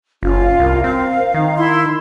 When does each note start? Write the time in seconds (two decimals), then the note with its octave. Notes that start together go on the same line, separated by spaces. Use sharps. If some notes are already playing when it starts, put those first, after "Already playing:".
0.23 F#1 C#4 F4
0.60 C2 A#4
0.84 C4 F5
1.34 D#3 D#4
1.57 E4 C6